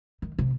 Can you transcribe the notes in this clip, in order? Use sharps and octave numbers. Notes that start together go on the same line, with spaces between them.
D#3
C3